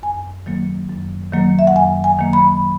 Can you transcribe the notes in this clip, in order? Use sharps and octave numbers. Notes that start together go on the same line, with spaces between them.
F#2 G#5
D#3 F#3 A#3
F#2
D#3 F#3 A#3
E5
F#5
F#2 G#5
G#5
D#3 F#3 A#3
B5